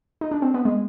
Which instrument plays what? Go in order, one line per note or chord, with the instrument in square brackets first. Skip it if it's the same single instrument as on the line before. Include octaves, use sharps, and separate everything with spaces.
[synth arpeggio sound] D#4
D4
C4
B3
G#3